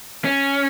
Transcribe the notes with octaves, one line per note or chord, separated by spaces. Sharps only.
C#4